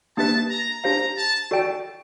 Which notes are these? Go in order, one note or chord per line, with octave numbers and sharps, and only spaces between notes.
A#3 D4 G4 B4 E5 A5
A#5
D4 G4 C5 F5 A#5
A5
F#4 A4 D5 G5